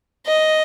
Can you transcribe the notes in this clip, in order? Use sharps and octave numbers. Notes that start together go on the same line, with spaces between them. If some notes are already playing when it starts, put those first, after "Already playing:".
D#5